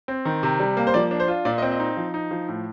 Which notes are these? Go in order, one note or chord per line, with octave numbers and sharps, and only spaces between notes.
C4
D#3
C3
G3
A#3
C5
F3 D5
D4
C5
F4
A#2 D5
D#5
C4
D#5
D#4
F3
D#4
F3
A2